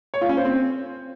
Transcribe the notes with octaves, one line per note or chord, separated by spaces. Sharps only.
C#5
F4
C#4
C5
C4